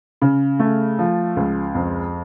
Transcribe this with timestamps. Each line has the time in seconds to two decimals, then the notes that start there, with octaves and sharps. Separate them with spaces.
0.22 C#3
0.59 A3
0.99 F3
1.37 C#2
1.75 F2